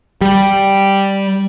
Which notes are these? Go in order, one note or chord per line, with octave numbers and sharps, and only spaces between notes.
G3